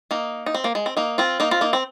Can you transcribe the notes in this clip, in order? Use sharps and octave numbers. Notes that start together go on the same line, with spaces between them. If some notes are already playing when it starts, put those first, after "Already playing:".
A#3 D#4
D#4
C4
A#3
G#3
C4
A#3 D#4
C4 F4
A#3 D#4
C4 F4
A#3 D#4
C4